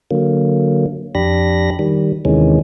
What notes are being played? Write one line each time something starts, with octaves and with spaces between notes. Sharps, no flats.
D3 F#3 A#3
F2 D4 G4 B5 A#6
D#3 G3
D#2 C3 D#3 E3 G#3 C#4